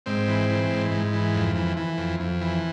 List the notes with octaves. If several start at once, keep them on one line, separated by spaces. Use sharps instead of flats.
G#2 C4
E3
E3
G#2
G#2
E3
F2
E3
E3
F2
F2
E3